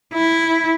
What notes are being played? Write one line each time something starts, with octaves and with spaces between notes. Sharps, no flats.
E4